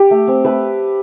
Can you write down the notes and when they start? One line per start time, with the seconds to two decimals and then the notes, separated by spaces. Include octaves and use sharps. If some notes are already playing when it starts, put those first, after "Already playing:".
Already playing: G4
0.11 A3
0.27 C4
0.45 A3 B4